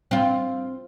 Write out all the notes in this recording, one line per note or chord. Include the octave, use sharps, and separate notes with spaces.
C4 F4